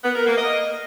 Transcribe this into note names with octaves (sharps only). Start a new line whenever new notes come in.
B3
A#4
A#3
D#5